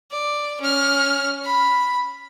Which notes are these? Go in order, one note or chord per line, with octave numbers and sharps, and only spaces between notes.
D5
C#4 F6
B5